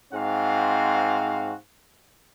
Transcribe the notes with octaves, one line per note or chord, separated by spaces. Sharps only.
G#2 C4 F#4 F5